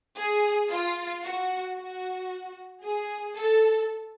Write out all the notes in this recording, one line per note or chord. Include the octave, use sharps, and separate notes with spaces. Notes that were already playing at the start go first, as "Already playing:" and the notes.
G#4
F4
F#4
F#4
G#4
A4